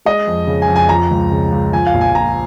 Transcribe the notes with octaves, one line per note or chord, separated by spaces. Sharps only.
G#3 D#5
F2
C#3
G#5
F2
G#5
F3 A#5
C#2
C#3
C#2
F3 G#5
F5
A#1
G#5
A#2 A#5